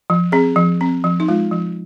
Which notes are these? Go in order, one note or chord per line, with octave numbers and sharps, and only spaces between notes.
F3
C4 G#4
F3
C4
F3
D#4
G#3 F4
F3